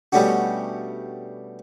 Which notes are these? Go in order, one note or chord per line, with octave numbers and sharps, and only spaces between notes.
B2 G3 A3 C#4 D4 F#4